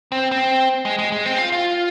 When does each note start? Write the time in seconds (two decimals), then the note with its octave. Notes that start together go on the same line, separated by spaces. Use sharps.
0.12 C4
0.32 C4
0.85 G#3
0.99 G#3
1.12 G#3
1.26 C4
1.38 F4
1.52 F4